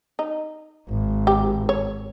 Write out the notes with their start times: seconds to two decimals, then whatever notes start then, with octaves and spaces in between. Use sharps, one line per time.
0.19 D#4
0.89 G#1
1.27 G4
1.69 C#5